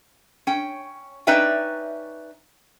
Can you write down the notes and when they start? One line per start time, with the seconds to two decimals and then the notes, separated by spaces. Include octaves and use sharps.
0.47 C#4 G5
1.27 C#4 D#4 B4 D5 E5 G5